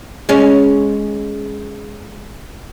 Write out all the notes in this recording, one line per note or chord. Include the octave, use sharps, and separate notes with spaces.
G#3 C#4